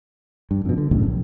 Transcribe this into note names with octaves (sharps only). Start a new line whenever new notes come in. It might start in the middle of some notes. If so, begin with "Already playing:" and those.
G2
F2 B2
D3
C2 F#2 A2 C#3
A#1